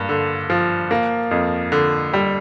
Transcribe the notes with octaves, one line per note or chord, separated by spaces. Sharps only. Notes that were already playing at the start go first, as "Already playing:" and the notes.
Already playing: G2 A#3
D3
F3
A#3
F2
D3
G3